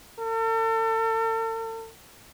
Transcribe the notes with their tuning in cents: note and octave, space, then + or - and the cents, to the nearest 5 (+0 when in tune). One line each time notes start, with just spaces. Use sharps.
A4 +40